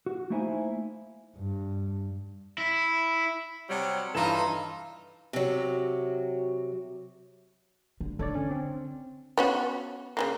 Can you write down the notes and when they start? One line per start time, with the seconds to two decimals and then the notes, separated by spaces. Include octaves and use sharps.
0.06 F#4
0.30 A3 A#3 D#4 E4 C5 G#5
1.37 G2
2.58 E4
3.69 C3 F#3 G3
4.15 G2 E3 D#4 F4 A4 E7
5.33 C3 F#3
8.00 D3
8.19 D3 A4 C#5 D5
8.35 C#4
8.51 C4
9.38 B3 C#4 F#4
10.17 C#3 E3 A#3